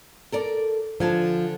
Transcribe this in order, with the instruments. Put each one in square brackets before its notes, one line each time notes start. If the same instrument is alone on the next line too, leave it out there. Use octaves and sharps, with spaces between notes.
[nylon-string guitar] A4 A#4 D5
[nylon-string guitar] D3 G#5 A5 [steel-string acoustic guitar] F3